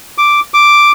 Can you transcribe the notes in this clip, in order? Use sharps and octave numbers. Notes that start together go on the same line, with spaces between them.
D6
D6